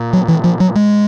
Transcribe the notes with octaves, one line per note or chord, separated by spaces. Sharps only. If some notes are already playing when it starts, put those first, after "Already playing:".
Already playing: A#2
F#3
E3
F3
F#3
G#3